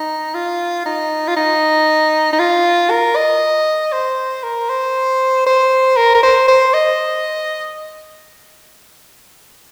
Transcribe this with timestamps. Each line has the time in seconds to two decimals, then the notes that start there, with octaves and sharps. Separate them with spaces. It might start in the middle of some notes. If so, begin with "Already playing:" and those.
Already playing: D#4
0.34 F4
0.86 D#4
1.27 F4
1.36 D#4
2.33 D#4
2.39 F4
2.90 A#4
3.16 D#5
3.92 C5
4.43 A#4
4.69 C5
5.46 C5
5.96 A#4
6.14 A#4
6.23 C5
6.48 C5
6.74 D#5